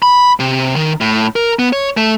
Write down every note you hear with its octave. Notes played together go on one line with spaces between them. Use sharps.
B5
C3
D#3
A2
A#4
B3
C#5
A3